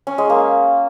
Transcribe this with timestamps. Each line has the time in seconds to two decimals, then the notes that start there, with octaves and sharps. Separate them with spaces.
0.07 C#4
0.18 G#3
0.30 A#3